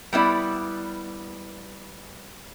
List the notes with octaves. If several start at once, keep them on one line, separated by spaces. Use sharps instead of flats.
G3 B3 E4 D5